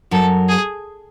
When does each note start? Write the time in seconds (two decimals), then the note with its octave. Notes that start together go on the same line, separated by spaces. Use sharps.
0.11 F#2 F#3 A4
0.49 G#4